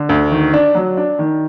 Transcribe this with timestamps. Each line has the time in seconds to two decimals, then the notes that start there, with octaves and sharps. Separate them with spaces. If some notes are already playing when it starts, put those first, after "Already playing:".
Already playing: D3
0.09 D2
0.31 D#3
0.53 D4
0.75 F#3
0.97 D4
1.19 D#3